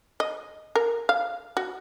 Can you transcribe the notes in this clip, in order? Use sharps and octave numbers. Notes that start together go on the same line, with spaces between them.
D#5
A#4
F5
F#4